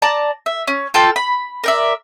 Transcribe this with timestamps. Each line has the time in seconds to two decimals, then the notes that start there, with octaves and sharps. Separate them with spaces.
0.02 D5 A5 A#5
0.46 E5
0.67 C#4
0.94 F4 A4 G5 A5
1.16 B5
1.64 A#4 D5 E5